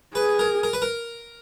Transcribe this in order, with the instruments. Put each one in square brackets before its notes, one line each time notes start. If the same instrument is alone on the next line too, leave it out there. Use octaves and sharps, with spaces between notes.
[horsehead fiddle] G#4 [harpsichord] B4
[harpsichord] A#4
A#4
B4
A#4